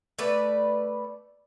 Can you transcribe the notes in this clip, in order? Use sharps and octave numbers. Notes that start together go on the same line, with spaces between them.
A3 B4 D5